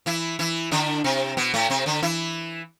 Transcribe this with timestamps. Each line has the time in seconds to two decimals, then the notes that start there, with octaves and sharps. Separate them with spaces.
0.06 E3 E4
0.39 E3 E4
0.71 D3 D4
1.04 C3 C4
1.37 B2 B3
1.54 A2 A3
1.70 C3 C4
1.86 D3 D4
2.03 E3 E4